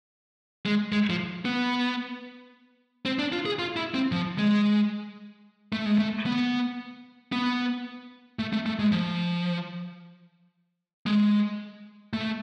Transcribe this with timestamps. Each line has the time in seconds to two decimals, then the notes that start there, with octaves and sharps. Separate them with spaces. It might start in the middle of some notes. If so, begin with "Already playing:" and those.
0.66 G#3
0.92 G#3
1.10 F3
1.45 B3
3.06 C4
3.19 D4
3.32 F4
3.46 G#4
3.59 F4
3.76 E4
3.94 C4
4.12 F3
4.39 G#3
5.73 A3
5.86 G#3
5.98 A3
6.26 B3
7.32 B3
8.39 A3
8.53 A3
8.66 A3
8.79 G#3
8.92 F3
11.06 G#3
12.13 A3